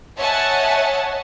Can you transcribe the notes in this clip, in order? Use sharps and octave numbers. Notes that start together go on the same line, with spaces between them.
C#5 D#5 E5 F#5 G#5 A5